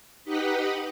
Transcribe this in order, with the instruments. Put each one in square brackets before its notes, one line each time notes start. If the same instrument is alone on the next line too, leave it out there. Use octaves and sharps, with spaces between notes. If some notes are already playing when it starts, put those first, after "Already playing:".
[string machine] D#4 G4 B4 D#5 F#5 B5